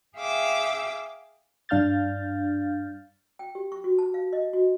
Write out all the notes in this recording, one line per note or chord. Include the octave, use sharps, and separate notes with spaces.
G#4 E5 F5 G5 D6 E6
G2 D4 F5 F6 G6 A6
G5
G4
C#6
F#4
A5
F5
D#5
F#4